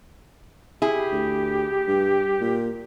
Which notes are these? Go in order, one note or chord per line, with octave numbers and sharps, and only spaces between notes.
E4 G4 G#4
D2
G2
A#2